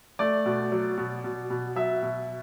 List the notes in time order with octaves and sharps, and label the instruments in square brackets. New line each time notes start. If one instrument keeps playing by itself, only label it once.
[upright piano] A3 D5
B2
F#3
B2
B2
B2
F#3 E5
B2